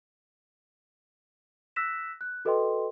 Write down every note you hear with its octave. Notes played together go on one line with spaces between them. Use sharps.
E6 F#6 A#6 B6 E7
F#6
F#4 A4 B4 D#5 G5 C6